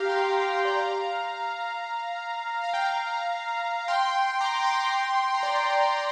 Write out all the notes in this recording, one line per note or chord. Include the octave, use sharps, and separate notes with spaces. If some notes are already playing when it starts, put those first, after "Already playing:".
Already playing: G4 F5 A#5
G5 C6
F5 A#5
G5 C6
G5 C6
D5 G5
F5 A#5
F5
G5
F5 A#5
G5 C6
A#5 D6
D6
G5 C6
A#5
D5 G5